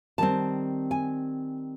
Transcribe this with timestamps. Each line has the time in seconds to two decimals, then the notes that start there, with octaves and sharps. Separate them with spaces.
0.18 D#3 G3 C4 A5
0.91 G#5